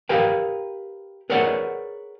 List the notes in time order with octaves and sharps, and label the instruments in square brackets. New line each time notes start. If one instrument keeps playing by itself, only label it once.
[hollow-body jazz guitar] G4 A#4 B4 F5 G5
G#4 A#4 B4 C#5 D5 F#5